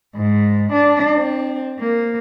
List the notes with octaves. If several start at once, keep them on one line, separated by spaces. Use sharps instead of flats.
G#2
D4
C4
A#3